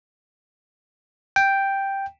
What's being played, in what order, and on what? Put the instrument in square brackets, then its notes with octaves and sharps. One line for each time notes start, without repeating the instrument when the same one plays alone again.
[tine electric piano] G5